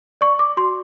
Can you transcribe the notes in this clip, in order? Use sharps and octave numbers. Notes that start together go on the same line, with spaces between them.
D5 C#6
D6
F#4 C6